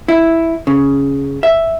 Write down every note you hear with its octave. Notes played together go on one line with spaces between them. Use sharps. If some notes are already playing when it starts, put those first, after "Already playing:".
E4
C#3
E5